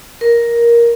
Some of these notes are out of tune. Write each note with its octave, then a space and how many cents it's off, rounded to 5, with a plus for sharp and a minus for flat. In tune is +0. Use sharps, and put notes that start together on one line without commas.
A#4 +10